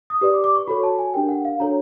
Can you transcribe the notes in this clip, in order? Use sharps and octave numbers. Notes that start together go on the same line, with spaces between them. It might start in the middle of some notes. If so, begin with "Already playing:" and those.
D#6
G4 B4 D5 D#6
D6
D6
C#6
F#4 A4 C#5 B5
A5
G#5
D4 G4 A#4 G5
F#5
F5
D4 F#4 A4 C#5 A#5